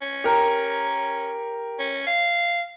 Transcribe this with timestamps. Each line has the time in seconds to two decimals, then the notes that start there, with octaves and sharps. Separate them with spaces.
0.02 C#4
0.24 G4 A#4
1.79 C#4
2.07 F5